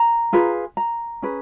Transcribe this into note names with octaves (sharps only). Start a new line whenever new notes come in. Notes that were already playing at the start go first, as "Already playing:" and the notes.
Already playing: A#5
F4 G#4 B4
A#5
C#4 G#4 B4